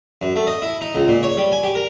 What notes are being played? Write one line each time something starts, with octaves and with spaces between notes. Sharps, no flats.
F#2
A3
D#5
E4
D#4
C#2
A#2
C#5
G3
G#5
G4
A#4